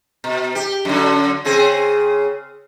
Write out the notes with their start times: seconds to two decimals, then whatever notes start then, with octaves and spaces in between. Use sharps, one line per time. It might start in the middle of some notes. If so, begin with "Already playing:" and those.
0.24 B2
0.55 G4
0.85 F#2 D3
1.45 C#3 C4 G#4